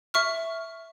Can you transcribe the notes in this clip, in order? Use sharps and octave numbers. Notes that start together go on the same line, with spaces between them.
E5 C#6 F6